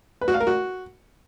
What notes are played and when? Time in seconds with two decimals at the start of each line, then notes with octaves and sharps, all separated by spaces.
0.21 B4
0.28 F#4
0.34 F5
0.40 A#4
0.47 F#4